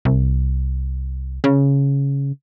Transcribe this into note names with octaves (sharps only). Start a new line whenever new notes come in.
C2
C#3